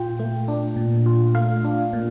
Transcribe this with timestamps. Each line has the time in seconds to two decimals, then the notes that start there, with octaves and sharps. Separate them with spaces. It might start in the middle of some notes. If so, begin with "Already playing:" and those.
Already playing: A#2 F4 G5
0.19 A3
0.48 D4
0.76 A#2
1.06 F4
1.34 A3 F5
1.64 D4
1.93 A#2